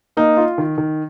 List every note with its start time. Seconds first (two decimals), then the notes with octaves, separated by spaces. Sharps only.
0.17 A#3 D#4
0.37 F4
0.58 D#3
0.78 D#3